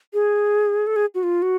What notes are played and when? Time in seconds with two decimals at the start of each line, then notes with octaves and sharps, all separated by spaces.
0.14 G#4
0.87 A4
0.96 G#4
1.15 F#4
1.23 F4
1.42 F#4